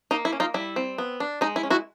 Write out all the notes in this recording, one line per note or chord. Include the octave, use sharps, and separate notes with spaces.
A#3 D#4
E4
C#4
D#4 F4
G3 E4
C4
B3
D4
G#3 D#4
E4
C#4
E4 F#4